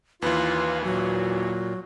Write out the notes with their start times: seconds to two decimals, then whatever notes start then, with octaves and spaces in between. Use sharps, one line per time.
0.22 D#2 E3 F4 B4
0.84 A#2 F#3